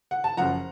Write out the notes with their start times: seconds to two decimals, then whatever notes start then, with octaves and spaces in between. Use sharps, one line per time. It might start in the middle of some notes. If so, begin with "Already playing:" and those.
0.11 F#5
0.24 A5
0.37 F#1 F#2 F3 F#5 A#5